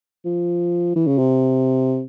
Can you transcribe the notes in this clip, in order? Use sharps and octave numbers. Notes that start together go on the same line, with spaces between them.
F3
E3
C#3
C3